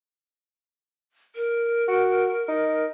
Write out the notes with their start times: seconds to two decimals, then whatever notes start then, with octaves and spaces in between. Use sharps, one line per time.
1.35 A#4
1.88 F#4
2.48 D#4